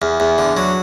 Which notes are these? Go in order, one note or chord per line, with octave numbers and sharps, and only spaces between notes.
E2
E2
D3
F#3